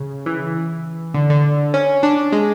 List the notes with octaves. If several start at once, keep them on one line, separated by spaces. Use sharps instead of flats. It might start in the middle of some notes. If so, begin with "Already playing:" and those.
Already playing: C#3
E3
D3
D3
C#4
D4
G#3